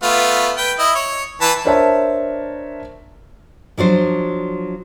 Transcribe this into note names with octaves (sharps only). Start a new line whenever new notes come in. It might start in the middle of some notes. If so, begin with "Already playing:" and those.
A3 B3 F4
B4 G5
E4 D#5
C#5
E3 B4 A5
D4 A#4 C5 C#5 E5 A5
F3 F#3 D4 C5